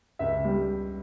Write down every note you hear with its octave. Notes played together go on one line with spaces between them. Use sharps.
C#2 E5
G3